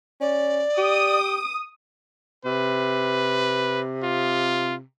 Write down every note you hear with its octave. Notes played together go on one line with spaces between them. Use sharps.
C#4 D5
G4 D#6
C3 B4
F4